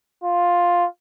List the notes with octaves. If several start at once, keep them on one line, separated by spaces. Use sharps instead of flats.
F4